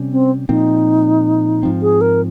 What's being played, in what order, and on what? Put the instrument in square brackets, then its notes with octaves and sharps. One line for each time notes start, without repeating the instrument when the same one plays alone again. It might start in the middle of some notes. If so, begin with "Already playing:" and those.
Already playing: [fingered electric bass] C3 G3 C#4
[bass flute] C4
[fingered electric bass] A#2 F3 C4 [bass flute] D#4
[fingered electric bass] G#2 F3 C4
[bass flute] G#4
A#4